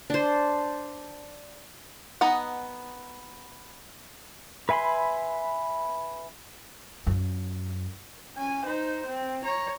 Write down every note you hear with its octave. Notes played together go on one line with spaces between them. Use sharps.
D4 C5
B3 D#4 D#5 F#5
B4 E5 G#5 B5 C6
F#2
C#4 G#5
D#4 C5
C4
C#5 A#5